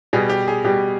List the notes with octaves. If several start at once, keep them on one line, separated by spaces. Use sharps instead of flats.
B2 G3 G#4
G4
G#4
B2 G3 G4